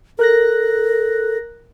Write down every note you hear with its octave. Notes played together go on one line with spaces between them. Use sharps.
A4 A#4 F#6 A#6